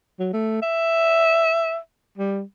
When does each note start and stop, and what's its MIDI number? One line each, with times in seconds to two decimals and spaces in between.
0.19 0.30 54
0.33 0.61 57
0.62 1.78 76
2.18 2.42 55